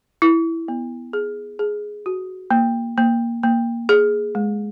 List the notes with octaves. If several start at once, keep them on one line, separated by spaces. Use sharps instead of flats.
E4
B3
G#4
G#4
F#4
A#3
A#3
A#3
G#4
G#3